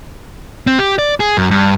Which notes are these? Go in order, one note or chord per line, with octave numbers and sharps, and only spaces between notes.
C4
G4
D5
G#4
F#2
G2